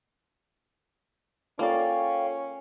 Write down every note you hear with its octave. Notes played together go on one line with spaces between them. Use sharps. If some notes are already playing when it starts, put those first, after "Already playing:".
A#3 C#4 F4 A4 D5 F5 G5 C#6